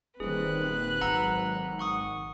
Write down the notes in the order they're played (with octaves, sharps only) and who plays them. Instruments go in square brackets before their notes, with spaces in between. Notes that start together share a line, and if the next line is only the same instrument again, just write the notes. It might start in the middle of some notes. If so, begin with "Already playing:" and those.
[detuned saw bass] D#1 [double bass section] D#3 G3 C4 [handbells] G#4 [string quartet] B4 F#6
[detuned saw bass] G#1 [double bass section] F#3 [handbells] F#5 A#5 E6
[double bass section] D#3 [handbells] F#5 C#6 D#6